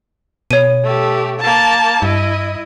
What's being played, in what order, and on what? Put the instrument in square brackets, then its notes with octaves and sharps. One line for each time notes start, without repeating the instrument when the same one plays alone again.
[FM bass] B2 [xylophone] C#5 D#7
[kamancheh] A3 G4
A#3 A5
[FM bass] G2 [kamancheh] E4 D#5